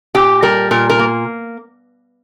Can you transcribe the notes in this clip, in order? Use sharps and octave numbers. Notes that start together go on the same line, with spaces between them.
A#2 G4
G3 A#4
A#2 A#4
A#4
A#3